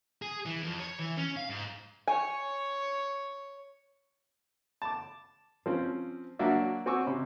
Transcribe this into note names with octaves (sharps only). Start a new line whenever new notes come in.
G#4
E3
F2
C#5
E3
C#4
F5
G#2
C#5 G#5
A5 D6
F3 C4 C#4
F#3 A#3 D4 F#4 D5 E5
C4 F#4 G#5 C#6 D6 E6
C3 C#4